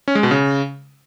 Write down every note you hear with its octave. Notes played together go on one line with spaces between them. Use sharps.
C#4
G#3
B2
C#3